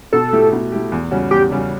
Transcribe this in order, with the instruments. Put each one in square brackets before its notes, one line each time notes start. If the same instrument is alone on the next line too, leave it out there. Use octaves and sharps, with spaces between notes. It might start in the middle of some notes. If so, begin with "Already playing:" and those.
[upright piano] B2 [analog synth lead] A4
[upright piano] A3 E4 G4
B2
A3 E4 G4
E2
C#3 G3 C#4 F#4
[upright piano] E2 [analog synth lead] G4
[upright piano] C#3 G3 C#4 F#4